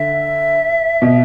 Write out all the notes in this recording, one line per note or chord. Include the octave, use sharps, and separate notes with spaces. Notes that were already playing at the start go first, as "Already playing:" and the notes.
Already playing: D3 E5
B2